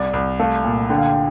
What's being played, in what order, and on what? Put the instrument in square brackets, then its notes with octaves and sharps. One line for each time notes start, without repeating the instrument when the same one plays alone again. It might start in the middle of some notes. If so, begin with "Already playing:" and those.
Already playing: [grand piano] C2 [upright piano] D5
[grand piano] C2
[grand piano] A3 [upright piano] F5
[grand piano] A#2
[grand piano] D3 [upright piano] G5
[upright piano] F5
G5